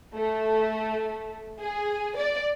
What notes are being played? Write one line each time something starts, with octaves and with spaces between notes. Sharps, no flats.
A3
G#4
D5